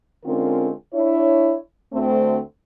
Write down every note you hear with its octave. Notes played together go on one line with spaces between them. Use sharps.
D3 G#3 C4 C#4 F4 A#4
D4 E4 C#5
D2 A3 C4